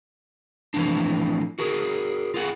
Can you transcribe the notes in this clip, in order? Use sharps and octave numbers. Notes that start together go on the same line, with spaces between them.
A2 E3 F3 C4 D4
F#4 G#4 A#4
F4 G#4 F#5